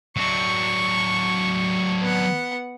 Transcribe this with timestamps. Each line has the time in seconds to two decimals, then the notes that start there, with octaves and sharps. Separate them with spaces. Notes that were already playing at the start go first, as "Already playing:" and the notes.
0.17 F#3 D4 C#6
2.01 B3 F#5